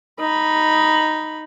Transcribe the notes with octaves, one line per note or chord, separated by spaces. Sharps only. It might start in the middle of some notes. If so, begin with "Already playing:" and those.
D#4 B5